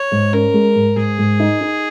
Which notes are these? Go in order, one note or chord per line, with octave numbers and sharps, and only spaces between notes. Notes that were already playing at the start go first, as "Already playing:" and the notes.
Already playing: C#5
G#2
C#4 A#4
G#3
G#2
G#2 G#4
G#2
D#4
D#4